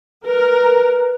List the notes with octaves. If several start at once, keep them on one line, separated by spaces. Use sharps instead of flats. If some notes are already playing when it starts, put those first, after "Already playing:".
A#4 B4